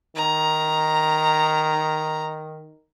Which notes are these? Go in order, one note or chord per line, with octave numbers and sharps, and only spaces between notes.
D#3 A#5